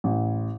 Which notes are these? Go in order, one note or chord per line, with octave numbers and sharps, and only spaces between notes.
A1